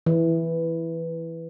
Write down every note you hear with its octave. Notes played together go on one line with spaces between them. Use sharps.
E3